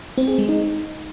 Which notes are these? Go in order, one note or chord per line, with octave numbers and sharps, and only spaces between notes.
C4
G#4
G#3
D#4